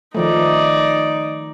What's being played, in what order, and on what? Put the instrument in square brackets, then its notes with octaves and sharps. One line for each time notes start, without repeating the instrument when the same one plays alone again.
[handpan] D#3 F3 A3 [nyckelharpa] D#4 D5